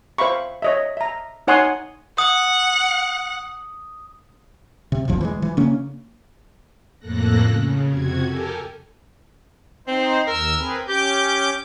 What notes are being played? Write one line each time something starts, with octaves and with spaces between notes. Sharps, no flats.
C5 E5 F5 B5 C#6
C#5 D#5 E5
E5 A#5
D#4 C#5 F#5 G#5 C6 D#6
F#5 D#6
C3
E1 A1 E2 F3
E3 F3 G#3
E3
C#3 A#3 C#4 D4
F2 A2 A#3 A4 F#6 A#6
C#3
F2 C3 F#4 G#6
G4 A4 A#4 G#5
C4 D#4 C5
D#2 A#4 E6
C4 G#4 B4
C#4 G4 D6 G6